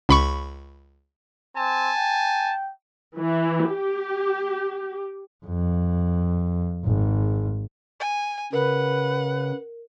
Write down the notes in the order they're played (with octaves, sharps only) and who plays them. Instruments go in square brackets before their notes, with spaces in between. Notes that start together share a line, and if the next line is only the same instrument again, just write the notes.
[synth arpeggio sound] C#2 B5 C#6
[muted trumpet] C4 [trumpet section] G#5 A5
[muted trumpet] G5
[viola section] E3
G4
[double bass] F2
G#1
[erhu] G#5
[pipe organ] C#3 [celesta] A#4 [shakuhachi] B4 [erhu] F#5